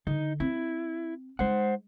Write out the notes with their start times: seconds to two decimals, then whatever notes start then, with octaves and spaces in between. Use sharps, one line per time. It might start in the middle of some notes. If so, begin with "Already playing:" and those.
0.07 D3 D#4
0.40 C4 E4
1.39 G#3 D#4 C5 F#5